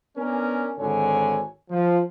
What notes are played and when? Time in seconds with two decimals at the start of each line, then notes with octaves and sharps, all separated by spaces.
0.17 B3 C#4 D4 A#4 G#5
0.79 G#1 D3 D#3 C#5 G#5
1.70 F3